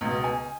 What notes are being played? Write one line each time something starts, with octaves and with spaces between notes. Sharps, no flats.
C#2 B2
G#5